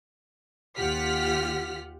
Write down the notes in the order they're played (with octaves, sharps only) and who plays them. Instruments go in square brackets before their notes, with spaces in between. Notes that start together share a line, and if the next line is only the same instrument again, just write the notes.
[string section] D#2 F4 G4 F#5 F6 B6